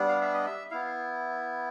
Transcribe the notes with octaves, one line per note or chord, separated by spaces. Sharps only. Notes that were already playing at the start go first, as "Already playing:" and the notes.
Already playing: G3 B3 D4
F5
E5
D#5
E5
B3 E4 F5